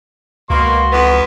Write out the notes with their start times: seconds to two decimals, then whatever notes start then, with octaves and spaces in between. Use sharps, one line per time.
0.50 C#2 B2 A#3 F#4 C6
0.92 F2 E3 B3